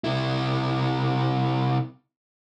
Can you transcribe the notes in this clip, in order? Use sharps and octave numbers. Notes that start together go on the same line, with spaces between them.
C3 E4